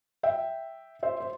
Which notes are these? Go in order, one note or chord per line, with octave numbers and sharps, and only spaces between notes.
E5 G5
C5 E5
C5